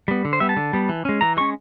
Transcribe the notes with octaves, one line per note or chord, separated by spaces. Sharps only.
G3 B3
D3
C5
G3 B3 E5
A5
D3
G3 B3
E3
G#3 C#4
E3 A#5
G#3 C#4 C#6